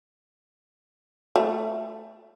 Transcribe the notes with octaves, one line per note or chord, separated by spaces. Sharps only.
A3